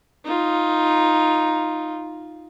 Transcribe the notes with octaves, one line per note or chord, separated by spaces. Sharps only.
D#4 F4